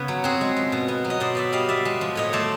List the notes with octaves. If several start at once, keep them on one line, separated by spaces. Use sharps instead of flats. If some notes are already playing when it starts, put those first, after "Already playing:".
Already playing: C#3 B3 B4 C#5
F#3
C4 F#4 G#4
G#3
F3
B2
B3
F#3
D#5
B2 C5 D5
B3 D5 E5
G3 D#5 F5
B3 D5 E5
G#3
F3
A2 C#5 D#5
A3 C5 D5